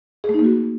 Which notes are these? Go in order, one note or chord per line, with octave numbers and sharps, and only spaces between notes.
G#4
A3
D#4
A#3
F#4